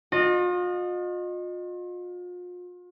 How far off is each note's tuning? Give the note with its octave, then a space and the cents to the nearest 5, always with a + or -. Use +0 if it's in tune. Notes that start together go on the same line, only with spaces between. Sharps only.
F4 +40 D#5 -20